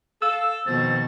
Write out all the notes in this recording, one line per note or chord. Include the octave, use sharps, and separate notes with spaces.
A4 F5 E6
F2 B2 D#3 C5 A6